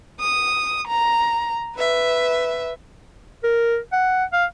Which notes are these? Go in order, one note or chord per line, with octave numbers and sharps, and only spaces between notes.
D#6
A#5
B4 E5
A#4
F#5
F5